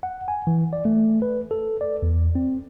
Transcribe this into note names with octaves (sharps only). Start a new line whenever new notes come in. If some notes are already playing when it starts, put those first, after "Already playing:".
F#5
G#5
E3
D5
A3
B4
A4
D5
E2
C4